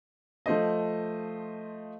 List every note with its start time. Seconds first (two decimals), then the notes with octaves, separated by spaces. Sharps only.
0.46 F3 A3 C5 D#5